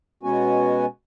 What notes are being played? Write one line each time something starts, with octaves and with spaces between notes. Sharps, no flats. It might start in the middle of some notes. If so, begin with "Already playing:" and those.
B2 G#3 B3 C#4 F#4 G#5